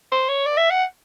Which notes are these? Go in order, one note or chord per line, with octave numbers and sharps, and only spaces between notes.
C5
C#5
D5
E5
F#5